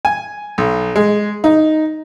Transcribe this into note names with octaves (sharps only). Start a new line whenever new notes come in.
G#5
B1
G#3
D#4